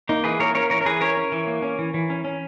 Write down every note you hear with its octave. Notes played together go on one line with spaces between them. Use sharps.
A#3 D#4
E3 G#4 B4
A#3 A#4 C#5
C#4 A#4 C#5
E3 A#4 C#5
A#4
E3 G#4 B4
C#4 A#4 C#5
C#4
E3
A#3
C#4
E3
E3
C#4
C#4